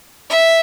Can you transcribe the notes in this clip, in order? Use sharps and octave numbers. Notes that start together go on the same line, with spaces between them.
E5